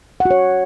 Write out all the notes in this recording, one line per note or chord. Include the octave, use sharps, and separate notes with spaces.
F#5
F#4
C#5